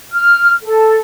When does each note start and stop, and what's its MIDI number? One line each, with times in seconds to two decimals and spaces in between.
0.13 0.53 89
0.63 1.00 69